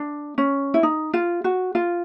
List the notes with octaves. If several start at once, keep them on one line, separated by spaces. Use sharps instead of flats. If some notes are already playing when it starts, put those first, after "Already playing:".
Already playing: D4
C#4
E4
D#4
F4
F#4
F4